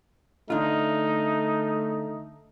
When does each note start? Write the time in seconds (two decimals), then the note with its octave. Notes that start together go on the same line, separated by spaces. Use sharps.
0.50 D3 A3 D4 D#4 F4